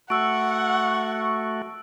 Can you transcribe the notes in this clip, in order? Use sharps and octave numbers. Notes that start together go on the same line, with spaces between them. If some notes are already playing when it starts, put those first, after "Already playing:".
A3 F#4 F#5 C#6 E6 D7